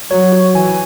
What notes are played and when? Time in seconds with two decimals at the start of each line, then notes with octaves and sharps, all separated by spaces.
0.11 F#3 C#5
0.32 F#4
0.54 E3 G#5